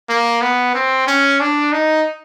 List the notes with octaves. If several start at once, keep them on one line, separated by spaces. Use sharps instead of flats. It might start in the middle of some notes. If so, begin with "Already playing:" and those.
A#3
B3
C4
C#4
D4
D#4